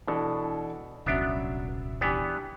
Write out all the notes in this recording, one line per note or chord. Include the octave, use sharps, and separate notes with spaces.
B2 E3 D4 A4
D#1 C2 F#3 B3 C#4 D4 E5
E3 B3 D4 G4 G#5